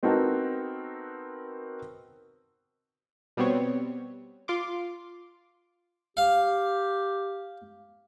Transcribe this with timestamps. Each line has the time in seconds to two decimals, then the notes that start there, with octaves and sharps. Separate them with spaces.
0.03 B3 C4 D#4 F#4 A4 A#4
3.37 B2 G3 B3 C4 C#5
4.48 F4 C6 D6
6.17 G4 F5